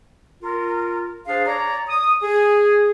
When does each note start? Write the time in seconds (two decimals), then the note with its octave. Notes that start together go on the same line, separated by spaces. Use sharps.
0.42 F4 A#4
1.27 D4 G#4 C5 F5
1.46 C#5 D5 A#5
1.88 D#6
2.22 G#4